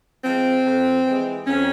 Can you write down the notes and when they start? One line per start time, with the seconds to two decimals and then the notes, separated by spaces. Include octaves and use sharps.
0.24 F3 G#3 C4
0.65 F2
1.05 E3 G#3
1.46 F2 C#4